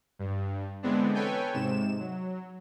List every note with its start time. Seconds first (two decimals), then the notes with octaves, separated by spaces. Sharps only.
0.19 G2
0.83 D3 E3 G#3 B3 C4 D4
1.14 A4 B4 C#5 G5 G#5
1.54 G#2 C3 E7
1.99 F#3